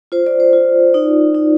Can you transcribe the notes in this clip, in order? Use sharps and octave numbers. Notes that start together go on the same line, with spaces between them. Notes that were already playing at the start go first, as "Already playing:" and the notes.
F4 C5
D5
C5
F4
D#4 D5
D#4